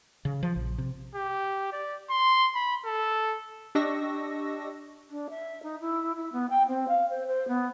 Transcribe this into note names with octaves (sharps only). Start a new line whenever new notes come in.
C#3
F3
A#1
C3
G4
D5
C6
B5
A4
D4 G4 D#5 C#6 E6 A#6
D4
E5
D#4
E4
E4
B3
G5
C4
F5
C5
C5
B3